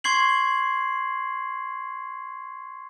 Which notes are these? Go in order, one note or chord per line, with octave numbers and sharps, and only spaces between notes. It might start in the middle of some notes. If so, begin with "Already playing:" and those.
C6 C#6 G#6 C7 F#7